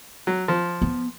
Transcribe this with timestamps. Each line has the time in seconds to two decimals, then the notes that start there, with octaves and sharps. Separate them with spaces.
0.27 F#3
0.48 F3
0.82 B3